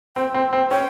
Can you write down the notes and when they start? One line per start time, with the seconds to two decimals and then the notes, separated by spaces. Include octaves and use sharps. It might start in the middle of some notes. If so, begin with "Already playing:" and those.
0.16 C4 G5
0.34 C4
0.53 C4
0.71 C#4 G5